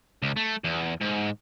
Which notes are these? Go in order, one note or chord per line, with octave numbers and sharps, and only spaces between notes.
C#2
A3
E2
G#2